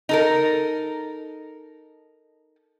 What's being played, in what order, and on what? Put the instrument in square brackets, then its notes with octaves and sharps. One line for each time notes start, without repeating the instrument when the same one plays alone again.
[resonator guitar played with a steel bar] D#4 A4 A#4